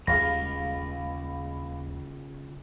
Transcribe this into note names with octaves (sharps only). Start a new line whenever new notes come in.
D#2 C#3 G3 F4 G#4 F5 B5 A#6